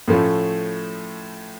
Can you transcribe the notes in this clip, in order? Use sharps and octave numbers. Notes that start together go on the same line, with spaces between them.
A2 F3 A3 C#4 F4